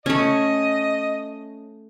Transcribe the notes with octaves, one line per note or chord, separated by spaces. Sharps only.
A3 C#4 D#5